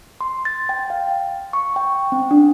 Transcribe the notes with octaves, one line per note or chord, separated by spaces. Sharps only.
C6
A6
G5
F5
C#6
G5
C4
D4